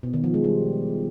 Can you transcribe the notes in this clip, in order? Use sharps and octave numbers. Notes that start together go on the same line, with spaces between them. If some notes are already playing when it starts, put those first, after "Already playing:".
B2
D#3
F3
G#3
G3